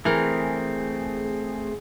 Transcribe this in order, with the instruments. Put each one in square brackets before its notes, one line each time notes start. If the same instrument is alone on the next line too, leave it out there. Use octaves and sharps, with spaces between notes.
[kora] E3 A#4 [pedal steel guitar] A3 C4 [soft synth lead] G#4